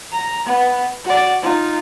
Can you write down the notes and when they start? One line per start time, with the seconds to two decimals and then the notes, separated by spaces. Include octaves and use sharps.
0.12 A#5
0.45 B3 B4
1.04 F#4 D5
1.42 D#4 F4